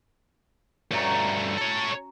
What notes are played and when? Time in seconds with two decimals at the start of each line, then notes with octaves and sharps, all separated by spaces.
0.91 G2 A3 C#4 F#4 A#5
1.58 A4 C#5